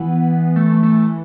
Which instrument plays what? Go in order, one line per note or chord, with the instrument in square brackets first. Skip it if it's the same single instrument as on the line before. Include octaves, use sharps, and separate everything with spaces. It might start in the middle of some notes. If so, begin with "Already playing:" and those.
Already playing: [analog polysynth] E3 [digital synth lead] B3
[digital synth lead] A3
A3